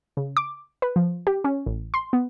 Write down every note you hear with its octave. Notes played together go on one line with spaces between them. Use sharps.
C#3
D6
B4
F3
G4
C#4
A1
C6
B3